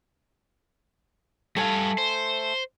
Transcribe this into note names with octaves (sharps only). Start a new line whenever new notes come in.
G3 A3 F5 G#5
C5